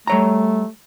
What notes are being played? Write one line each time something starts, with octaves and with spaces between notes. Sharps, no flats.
G3 A3 C#5 A#5